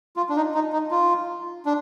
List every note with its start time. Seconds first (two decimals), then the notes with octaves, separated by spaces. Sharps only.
0.16 F4
0.29 D4
0.36 D#4
0.55 D#4
0.73 D#4
0.91 F4
1.66 D4